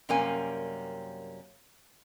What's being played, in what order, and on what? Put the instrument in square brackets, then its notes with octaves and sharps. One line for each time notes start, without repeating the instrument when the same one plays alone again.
[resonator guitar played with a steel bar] F#2 C3 G3 A#3 C#4 G#5